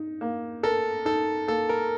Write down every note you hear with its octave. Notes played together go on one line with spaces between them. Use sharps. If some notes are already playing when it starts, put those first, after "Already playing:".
Already playing: D#4
A#3
A4 A#4
D#4 A4
A#3 A4
A#4